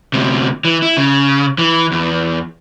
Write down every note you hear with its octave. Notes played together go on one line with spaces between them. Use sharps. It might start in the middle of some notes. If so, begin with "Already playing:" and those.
D2 C3
E3
E4
C#3
E3
E2